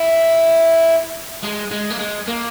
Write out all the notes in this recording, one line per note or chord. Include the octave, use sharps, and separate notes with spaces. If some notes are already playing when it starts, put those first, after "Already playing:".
Already playing: E4
G#3
G#3
A#3
G#3
A#3